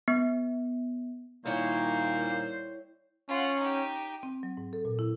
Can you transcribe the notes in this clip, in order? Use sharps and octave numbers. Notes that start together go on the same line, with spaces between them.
B3
A#2 D#3 G3 A#3 E4 C5 C#5 G5
C#4 F4 F#5
D#4 G4
C4
F#3
G#2
A4
A#2
E4